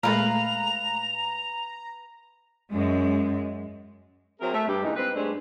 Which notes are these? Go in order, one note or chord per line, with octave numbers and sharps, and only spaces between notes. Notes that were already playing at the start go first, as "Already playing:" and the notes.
A#2 G#3 A3 B4 F5 A#5 F7
F#2 G#3
F#3 C4 G#4 A#4 C5 E5
A3 E5
G2 G4
A#2 E3 G#3 D#4
C4 B4
G2 G#3 A3 C4 D4